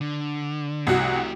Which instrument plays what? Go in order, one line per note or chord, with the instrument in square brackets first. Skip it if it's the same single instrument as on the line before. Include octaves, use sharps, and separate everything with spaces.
[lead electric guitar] D3
[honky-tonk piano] C2 F#4 [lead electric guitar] A3 G4